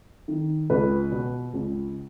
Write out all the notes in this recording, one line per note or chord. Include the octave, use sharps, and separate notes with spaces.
D#3
C#2 B4
B2
C#2